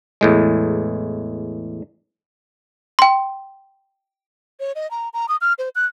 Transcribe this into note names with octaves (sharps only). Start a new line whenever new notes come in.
E2 A2 G#3
G5 C6
C#5
D#5
A#5
A#5
D#6
F6
C5
F#6